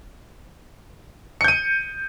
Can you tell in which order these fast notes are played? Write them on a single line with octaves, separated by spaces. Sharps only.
C#7 G6 D#7